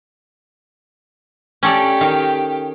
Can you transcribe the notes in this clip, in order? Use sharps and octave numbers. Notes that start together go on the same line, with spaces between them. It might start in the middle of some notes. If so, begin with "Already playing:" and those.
C#4 G4 A4 D5
D#3 F5